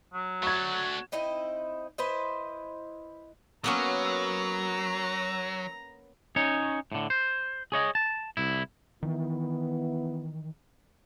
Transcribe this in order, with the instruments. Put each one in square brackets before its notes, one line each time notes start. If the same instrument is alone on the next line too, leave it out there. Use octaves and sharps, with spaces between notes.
[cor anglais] F#3
[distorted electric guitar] A3 D4 [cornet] F#4 [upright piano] C#6 G#6
[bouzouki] C4 D#4 E4 D#5
E4 B4 C5 D#5
[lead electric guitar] F#3 [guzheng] A#3 B3 C#4 [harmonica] A#5
[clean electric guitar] C#4 D#4 C#5
A2 D3
C5
G#4 C#5 D#5
A5
C2 E4
[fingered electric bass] D#3 E3 [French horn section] B3 E4